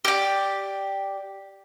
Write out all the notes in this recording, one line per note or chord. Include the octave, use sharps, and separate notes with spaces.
G4 D5